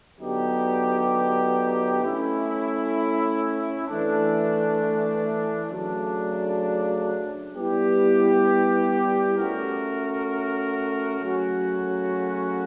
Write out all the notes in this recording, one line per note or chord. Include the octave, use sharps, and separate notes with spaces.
D3 F#3 B3 D#4 G4
A3 C#4 E4
E3 A3 D4
C#3 F#3 A3 D4
G3 B3 E4 G4
A3 C#4 F#4 A#4
C#3 F#3 A3 C#4 F#4